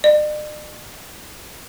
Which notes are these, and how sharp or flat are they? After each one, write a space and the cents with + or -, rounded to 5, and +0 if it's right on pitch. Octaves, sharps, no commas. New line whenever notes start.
D5 +45